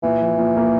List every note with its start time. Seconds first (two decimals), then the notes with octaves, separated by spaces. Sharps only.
0.03 A#2 E3
0.21 F3
0.38 A#2
0.56 A#3